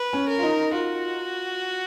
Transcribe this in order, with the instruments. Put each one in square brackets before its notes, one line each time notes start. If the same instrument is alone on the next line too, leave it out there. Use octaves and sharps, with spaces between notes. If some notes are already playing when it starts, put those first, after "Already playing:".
Already playing: [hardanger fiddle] B4
[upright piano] C#4
[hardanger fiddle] A#4
[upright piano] F4
D#4
[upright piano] F4 [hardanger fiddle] F#4